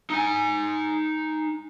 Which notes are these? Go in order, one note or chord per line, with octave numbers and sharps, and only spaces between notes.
D#4 G#5